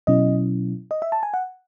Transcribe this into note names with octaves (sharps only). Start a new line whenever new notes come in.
B2 F#3 C#4 E4 D#5
D#5
E5
A5
G#5
F#5